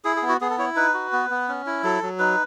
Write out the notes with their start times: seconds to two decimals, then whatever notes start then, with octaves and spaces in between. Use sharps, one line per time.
0.05 E4 G#4
0.16 G#4
0.22 B3
0.29 F#4
0.41 B3 G#4
0.50 A4
0.58 E4 C#5
0.76 D#4 B4
0.94 F#4
1.13 B3
1.30 B3
1.49 C#4
1.66 E4
1.83 F#3 A4
2.02 F#3
2.19 D#4 B4